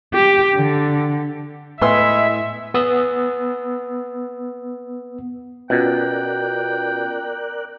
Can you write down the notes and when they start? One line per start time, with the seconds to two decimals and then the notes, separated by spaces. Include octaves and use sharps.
0.14 G4
0.56 D3
1.81 A2 G#3 B3 E4 G#4 E5 C6 E6
2.74 B3 D#6 E6
5.70 B2 B3 C#4 F4 A#4 D5 G5 F#6